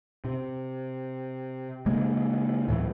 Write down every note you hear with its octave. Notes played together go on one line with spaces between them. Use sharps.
C3
C#3 G#3 A#3
D2 A2 E3 F#3